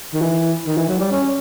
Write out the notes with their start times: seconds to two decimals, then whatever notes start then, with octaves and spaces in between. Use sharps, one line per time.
0.14 D#3
0.21 E3
0.67 D#3
0.77 E3
0.89 F#3
1.00 G3
1.12 C#4